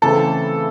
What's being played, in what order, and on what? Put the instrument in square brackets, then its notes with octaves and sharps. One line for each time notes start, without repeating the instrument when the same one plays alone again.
[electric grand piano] C#3 E3 A3 C4 E4 [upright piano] A4